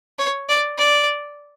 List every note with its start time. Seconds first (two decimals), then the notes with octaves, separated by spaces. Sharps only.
0.19 C#5
0.49 D5
0.78 D5